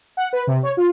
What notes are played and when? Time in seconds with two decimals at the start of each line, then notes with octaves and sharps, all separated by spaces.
0.17 F#5
0.33 B4
0.47 C3
0.63 C#5
0.77 F4